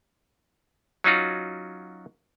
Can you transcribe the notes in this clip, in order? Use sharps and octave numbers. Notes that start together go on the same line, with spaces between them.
F#3 C#4 D#4 F4 F#4